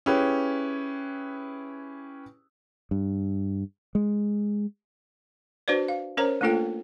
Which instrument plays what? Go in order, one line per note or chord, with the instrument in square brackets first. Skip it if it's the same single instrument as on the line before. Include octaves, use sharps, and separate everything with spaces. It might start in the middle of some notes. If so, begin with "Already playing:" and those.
[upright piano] C#4 E4 G4 G#4 B4
[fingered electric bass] G2
G#3
[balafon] D4 F#4 B4 C5 D5
F5
C#4 A#4 C5 C#5 A#5
A3 A#3 D4 F4 A4 G5